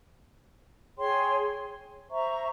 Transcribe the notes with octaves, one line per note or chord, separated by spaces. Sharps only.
G#4 C#5 G5 C6
C5 E5 A#5 C#6